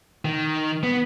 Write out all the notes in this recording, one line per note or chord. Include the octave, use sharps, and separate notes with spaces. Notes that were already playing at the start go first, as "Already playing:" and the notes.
D#3
B3